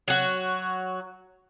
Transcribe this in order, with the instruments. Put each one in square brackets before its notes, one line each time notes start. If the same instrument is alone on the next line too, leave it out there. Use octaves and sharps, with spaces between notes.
[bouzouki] F#3 F#4